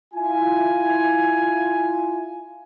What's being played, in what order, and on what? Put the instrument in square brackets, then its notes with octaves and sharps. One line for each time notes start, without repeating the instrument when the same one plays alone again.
[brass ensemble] E4 F4 G#5